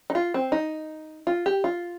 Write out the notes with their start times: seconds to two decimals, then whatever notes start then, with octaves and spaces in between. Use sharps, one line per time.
0.10 D#4
0.15 F4
0.34 C4
0.52 D#4
1.27 F4
1.46 G4
1.64 F4